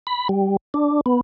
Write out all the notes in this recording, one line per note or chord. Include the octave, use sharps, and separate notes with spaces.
B5
G3
D4
B3